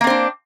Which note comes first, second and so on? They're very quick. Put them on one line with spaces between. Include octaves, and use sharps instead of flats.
A#3 C4 C5 D4